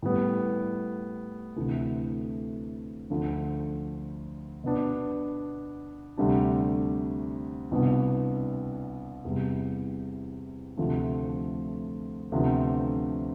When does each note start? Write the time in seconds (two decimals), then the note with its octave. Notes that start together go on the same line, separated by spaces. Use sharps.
0.02 A2 G3 B3
1.56 D2 C3 E3 A3
3.10 D2 D3 F3
4.64 B2 B3 D4
6.17 D2 C3 G3 D4
7.71 C2 B2 B3 D4
9.25 E2 C3 G3
10.77 D2 C3 F3 A3
12.32 D2 C3 F3 B3 D4